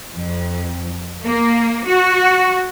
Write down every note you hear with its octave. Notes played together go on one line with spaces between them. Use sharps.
F2
A#3
F#4